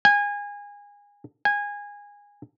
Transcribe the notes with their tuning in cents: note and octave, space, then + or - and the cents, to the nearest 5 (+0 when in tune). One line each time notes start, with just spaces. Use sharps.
G#5 -25
G#5 -20